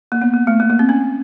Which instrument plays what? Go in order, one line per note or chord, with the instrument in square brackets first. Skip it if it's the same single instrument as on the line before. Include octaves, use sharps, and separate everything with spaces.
[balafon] A#3
B3
A#3
A3
A#3
A#3
C4
C#4